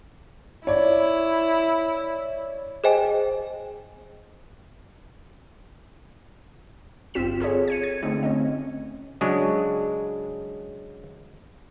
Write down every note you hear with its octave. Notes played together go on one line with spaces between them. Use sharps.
E4 C#5 D5
G#4 C5 D#5 G5 G#5
G1 C4 F4 B6 E7
F4 G#4 A4 C#5
G#6 C#7 D#7
G#6
D3 A3 C4 D#4
C#4 D#5
C#3 F#3 G#3 D4